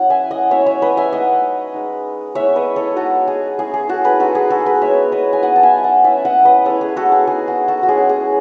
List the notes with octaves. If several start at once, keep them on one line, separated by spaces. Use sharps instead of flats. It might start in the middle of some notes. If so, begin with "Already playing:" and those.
Already playing: F#3 C#4 E4 F#5
E5 G#5
D#5 F#5
F#3 C#4 E4 C#5 E5
C#5 E5
B4 D#5
E5 G#5
A3 D#4 D#5 F#5
G#3 D#4
G#3 B3 E4 C#5 E5
B4 D#5
A4 C#5
G#3 B3 D#4 F#4 A4
G#4
A3 C#4 E4 G#4
G#4
F#4 A4
G#4 B4
G#3 D#4 F#4 A4
G#4
F#4 A4
G#4 B4
G#3 B3 E4 C#5 E5
B4 D#5
G#5
F#3 B3 D#4 D#5 F#5
A5
E5 G#5
F#5 A5
A3 C#4 E4 E5 G#5
D#5 F#5
B4 D#5
G#3 C#4 E4 A4 C#5
G#4
F#4 A4
G#4
G#3 B3 D#4 G#4
F#4
F#4 A4
F#4
G#3 C#4 E4 G#4
G#4